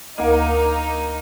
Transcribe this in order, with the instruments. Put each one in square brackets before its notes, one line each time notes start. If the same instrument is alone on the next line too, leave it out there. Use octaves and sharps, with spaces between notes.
[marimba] D2 D#5 [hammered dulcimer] A#3 [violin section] D#4